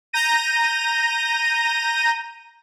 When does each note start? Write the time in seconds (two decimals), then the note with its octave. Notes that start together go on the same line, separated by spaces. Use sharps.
0.13 A#5 G6 A#6 D#7